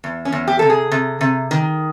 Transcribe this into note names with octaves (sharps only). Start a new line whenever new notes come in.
E2
C#4
E2
G4
C3 A4
G#4
C3
C3
D#3